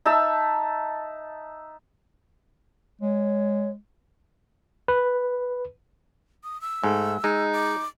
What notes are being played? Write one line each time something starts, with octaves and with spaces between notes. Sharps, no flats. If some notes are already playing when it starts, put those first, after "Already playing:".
D#4 E5 A5 E6
G#3 C#5
B4
D#6
E6
G#2 A3
G#3 D#4
D6